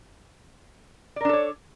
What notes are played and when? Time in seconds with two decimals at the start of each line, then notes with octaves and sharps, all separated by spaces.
1.16 D5
1.21 A#4
1.25 D4
1.29 A4
1.33 C#5